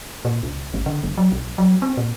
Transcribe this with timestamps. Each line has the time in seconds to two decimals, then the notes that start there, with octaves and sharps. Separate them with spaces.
0.25 A#2
0.43 C#2
0.74 G#1
0.86 D3
1.03 F#1
1.18 F#3
1.32 B1
1.58 F#3
1.82 C4
1.97 A#2